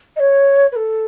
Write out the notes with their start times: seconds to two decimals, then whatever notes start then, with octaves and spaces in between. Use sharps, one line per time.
0.16 D#5
0.20 C#5
0.72 B4
0.76 A4